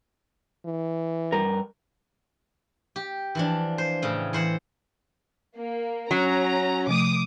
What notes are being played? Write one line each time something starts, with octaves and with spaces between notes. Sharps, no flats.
E3
G2 A#4
G4
E3 F3 D4
C5
A2 C#3 G5
E3 C5 F#5
A#3
F#3 C#4 A#5
C3 F3 A3 D6 D#6